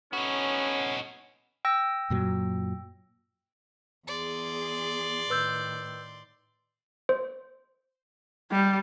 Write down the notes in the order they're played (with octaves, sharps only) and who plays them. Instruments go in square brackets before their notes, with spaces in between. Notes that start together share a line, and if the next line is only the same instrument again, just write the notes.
[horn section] A2 B3 C#4 [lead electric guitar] D#4 F#4
[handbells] G5 E6 A#6
[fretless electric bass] F#2 A#2 F#3
[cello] E2 G#4 [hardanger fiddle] D5 C6
[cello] A2 D#3 [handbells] B4 E6 G6
[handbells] C5
[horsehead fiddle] G3